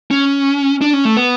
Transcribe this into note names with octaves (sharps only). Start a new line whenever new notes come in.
C#4
D4
C#4
A3
B3